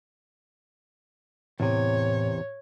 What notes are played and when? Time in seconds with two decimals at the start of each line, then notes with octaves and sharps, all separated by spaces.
1.60 E2 A2 C3 C#5